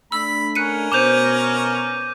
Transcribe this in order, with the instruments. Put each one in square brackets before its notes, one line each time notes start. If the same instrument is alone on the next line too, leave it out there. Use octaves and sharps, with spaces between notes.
[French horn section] A3 D4 [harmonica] B5 [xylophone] E6
[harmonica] C#4 A#4 [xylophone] F#6 C#7 D#7
[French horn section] B2 B3 [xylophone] C5 F7 G7 [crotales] D6 G6 D#7